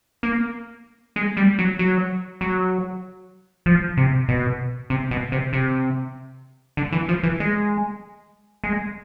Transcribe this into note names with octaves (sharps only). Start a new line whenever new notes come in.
A#3
G#3
G3
F#3
F#3
F#3
F3
C3
B2
C3
B2
C3
C3
D3
E3
F3
E3
G#3
G#3